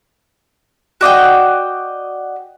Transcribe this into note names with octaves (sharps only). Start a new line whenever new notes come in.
F#4 D5 D#5 G5